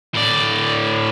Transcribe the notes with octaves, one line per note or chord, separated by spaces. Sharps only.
A2 D5